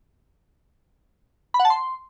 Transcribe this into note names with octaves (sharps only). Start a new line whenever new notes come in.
B5
F#5
A5
C6